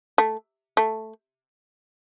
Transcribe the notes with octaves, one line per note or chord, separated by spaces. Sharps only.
A3
A3